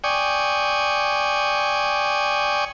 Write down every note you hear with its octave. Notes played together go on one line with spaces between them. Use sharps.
D5 G5 G#5 C#6 D#6